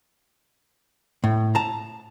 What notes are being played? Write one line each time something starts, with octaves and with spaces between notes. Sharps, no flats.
A2
A5 A#5